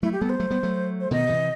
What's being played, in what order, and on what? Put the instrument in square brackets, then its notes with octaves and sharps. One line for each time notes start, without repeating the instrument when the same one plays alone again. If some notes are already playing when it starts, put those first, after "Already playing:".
[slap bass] F#3 A3 [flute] E4
[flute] G4
[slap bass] G3 B3 [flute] A4
[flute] C5
[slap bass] F#3 A3
G3 B3
F#3 A3
[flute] C5
[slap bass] B2 D#3 [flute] D#5
[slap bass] C3 E3